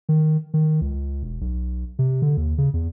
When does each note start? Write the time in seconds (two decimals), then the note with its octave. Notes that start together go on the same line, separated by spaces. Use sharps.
0.09 D#3
0.54 D#3
0.81 C#2
1.23 E1
1.41 B1
1.99 C3
2.22 D3
2.37 D#2
2.58 C#3
2.74 E2